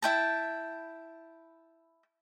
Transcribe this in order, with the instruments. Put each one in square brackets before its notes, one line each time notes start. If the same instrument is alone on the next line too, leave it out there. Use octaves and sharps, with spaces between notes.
[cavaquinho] E4 G5 A5